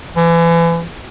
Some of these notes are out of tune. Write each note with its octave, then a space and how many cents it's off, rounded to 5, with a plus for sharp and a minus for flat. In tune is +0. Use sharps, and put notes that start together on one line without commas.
E3 +35